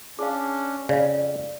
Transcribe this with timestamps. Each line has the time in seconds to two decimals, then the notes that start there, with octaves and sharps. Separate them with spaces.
0.19 C#4 D4 G#4 F5
0.89 F2 C#3 D5 F5